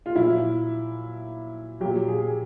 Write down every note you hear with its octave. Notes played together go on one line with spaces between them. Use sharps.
F4
A#2 F#3 E4
A#2 F#3 G4
G#4